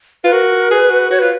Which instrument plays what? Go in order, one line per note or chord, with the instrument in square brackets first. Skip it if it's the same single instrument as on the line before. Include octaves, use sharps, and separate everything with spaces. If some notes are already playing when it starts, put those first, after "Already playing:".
[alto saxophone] F4 [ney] B4
[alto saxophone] F#4 [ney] A#4
[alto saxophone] G#4 [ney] B4
[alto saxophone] F#4
[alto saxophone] F#4 [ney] C#5
[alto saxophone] F4 [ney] B4